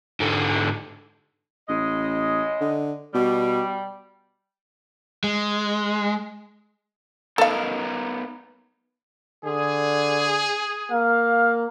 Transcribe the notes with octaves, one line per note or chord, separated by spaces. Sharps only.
G#2 D3
A1 C#3 G#3 D#5
D3
B2 G3
G#3
B3 D#4 A4 A#4 F5
D3 G#4
A#3 F5